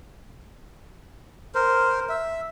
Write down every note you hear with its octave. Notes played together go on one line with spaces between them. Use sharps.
A#4 C5
E5